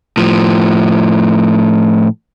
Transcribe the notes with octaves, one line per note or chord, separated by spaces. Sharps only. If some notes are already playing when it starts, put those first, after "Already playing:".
A2 F3